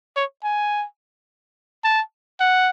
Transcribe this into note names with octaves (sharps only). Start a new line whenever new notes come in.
C#5
G#5
A5
F#5